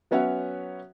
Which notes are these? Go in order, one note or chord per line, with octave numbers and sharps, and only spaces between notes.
F#3 B3 C#4 C#5 E5 F#5